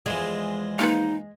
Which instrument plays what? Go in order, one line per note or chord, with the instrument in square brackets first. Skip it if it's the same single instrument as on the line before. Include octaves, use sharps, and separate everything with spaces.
[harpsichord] E2 E3 F3 [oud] G#3
[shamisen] A#3 F4 B4 [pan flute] D#4